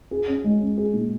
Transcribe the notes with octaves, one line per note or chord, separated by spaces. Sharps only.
G#4
C#4
G#3
C#4
G#4
A#2